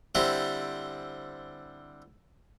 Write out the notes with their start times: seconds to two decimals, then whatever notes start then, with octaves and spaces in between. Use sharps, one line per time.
0.15 D3 G3 C4 E4